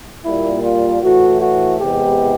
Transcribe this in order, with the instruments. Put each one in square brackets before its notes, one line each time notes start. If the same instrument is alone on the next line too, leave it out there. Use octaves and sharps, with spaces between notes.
[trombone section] A#2 G3 A#3 E4
F4
A2 E3 A3 F#4
F#4
E2 C3 E3 G#3 B3 G4